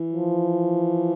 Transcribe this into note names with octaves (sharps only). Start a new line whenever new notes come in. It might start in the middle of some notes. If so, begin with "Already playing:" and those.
Already playing: E3
F3